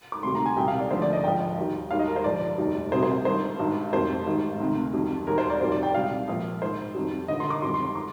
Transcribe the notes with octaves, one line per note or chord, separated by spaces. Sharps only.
D6
D2 C3 D#3 G3 C6
A#5
G#5
C2 C3 G3 G5
F5
D5
D2 D3 F3 C5
D5
D#5
G#1 G#2 F3 G5
D#2 D#3 G3
D#2 D#3 G3 F5
D#5
A#4
C5
G1 G2 F3 D5
F1 D#2 D#3 G3
C2 C3 G3 C5
C5
G1 G2 D#3 C5
G#1 G2 D#3 G3
F1 F2 D#3 G3 C5
G#1 G#2 D#3 G3
D2 C3 D#3
F2 D#3 G3
D#2 D#3 G3 A#4
C5
D5
G1 F2 D#3 G3 C5
D5
G5
C2 C3 G3 F5
A#1 A#2 F3
A#1 G#2 D#3 C5
F2 D#3 G3
G1 G2 D3 D#5
C6
D6
G1 F2 D#3 G3 C6
C6
C6
D6